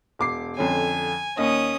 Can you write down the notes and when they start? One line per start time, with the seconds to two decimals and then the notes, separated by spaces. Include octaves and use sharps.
0.19 E1 D6 C7
0.57 F2 D3 C#4 G#5
1.37 D#2 C#4 D#5 D#6